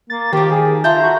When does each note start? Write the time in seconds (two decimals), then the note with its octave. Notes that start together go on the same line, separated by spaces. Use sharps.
0.10 A#3 A6
0.33 D#3 F3 A#3 G4
0.51 G#4
0.84 F4 A4 E5 A#5 G6
1.03 F#4